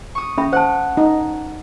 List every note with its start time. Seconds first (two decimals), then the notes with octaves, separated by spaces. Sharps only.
0.15 C#6 D#6
0.38 C#4 E5 B5
0.53 C5 F#5 A5
0.97 D#4